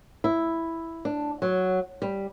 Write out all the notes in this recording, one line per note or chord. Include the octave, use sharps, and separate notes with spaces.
E4
D4
F#3
G3